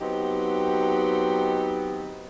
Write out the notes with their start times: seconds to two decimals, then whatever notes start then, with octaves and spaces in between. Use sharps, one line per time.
0.01 F#3 B3 C4 D#4 G4